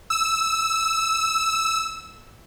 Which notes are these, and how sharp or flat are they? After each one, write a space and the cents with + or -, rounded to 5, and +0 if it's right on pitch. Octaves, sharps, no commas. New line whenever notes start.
E6 -10